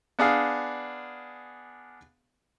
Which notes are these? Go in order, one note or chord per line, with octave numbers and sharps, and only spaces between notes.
B3 D4 G#4 F5